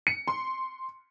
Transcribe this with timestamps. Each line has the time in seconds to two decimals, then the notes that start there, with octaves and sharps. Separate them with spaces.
0.07 C#7
0.28 C6